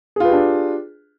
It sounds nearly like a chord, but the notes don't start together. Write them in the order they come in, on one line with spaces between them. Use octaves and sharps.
G#4 F4 B4 G4 D4